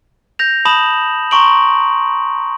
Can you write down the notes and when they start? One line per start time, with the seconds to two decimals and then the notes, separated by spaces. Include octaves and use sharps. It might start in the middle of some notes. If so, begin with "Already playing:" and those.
0.39 G6 A#6 F7
0.65 A5 B5 D#6 E7 F#7
1.31 A#5 C6 C#6 D7 F#7